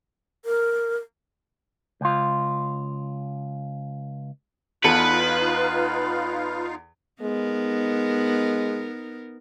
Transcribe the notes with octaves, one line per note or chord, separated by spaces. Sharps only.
A#4
C#2 F4
E2 D#4 F4 A4 B4 F5 C#7
G#3 B3 D#4 A#4